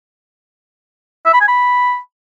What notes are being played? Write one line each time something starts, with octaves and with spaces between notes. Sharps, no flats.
E5
B5
G#5
B5